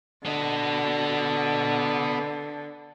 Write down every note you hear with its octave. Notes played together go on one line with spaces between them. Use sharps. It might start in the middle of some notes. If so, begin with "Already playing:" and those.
D3 B3 D#5